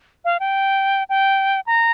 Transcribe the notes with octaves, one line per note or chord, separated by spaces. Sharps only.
F5
G5
G5
A#5